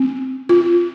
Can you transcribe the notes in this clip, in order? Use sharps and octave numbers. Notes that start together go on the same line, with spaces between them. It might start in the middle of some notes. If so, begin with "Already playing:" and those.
Already playing: C4
F4